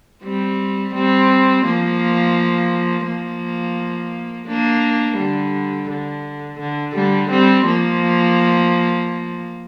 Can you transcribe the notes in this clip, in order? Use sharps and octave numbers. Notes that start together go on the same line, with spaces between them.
G3 C4
G3 C4
F3 A#3
F3 A#3
A#3 D4
D3 G3
D3
D3
D3 G3
G3 C4
F3 A#3